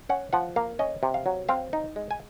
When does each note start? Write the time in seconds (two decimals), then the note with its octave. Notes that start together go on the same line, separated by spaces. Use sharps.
0.09 C#4 F#5
0.33 F3 F#5
0.56 A#3 F5
0.79 C#4 D#5
1.03 C3
1.14 F5
1.26 F#3
1.49 C4 F5
1.73 D#4
1.96 G#3
2.11 G#5